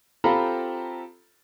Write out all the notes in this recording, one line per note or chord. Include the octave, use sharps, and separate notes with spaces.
C4 F4 G4 A4 A#5 B5